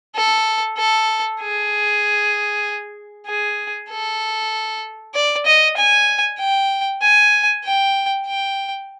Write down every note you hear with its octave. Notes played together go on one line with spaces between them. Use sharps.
A4
A4
G#4
G#4
A4
D5
D#5
G#5
G5
G#5
G5
G5